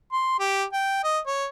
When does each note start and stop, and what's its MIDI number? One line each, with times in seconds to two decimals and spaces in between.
0.13 0.35 84
0.39 0.63 67
0.73 1.01 79
1.04 1.19 75
1.27 1.46 73